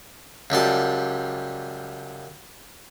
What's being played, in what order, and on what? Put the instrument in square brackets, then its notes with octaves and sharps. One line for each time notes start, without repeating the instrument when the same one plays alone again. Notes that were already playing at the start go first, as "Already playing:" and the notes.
[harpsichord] C#2 F#2 G3 A5